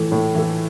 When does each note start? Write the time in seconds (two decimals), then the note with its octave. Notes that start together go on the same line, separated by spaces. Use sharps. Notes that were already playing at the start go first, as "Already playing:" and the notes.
Already playing: A2 E3 A3
0.12 A2
0.35 E3 A3